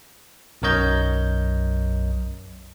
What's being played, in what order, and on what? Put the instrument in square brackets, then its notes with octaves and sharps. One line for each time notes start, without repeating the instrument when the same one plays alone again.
[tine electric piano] B1 F#2 A#4 C#5 D#5 G6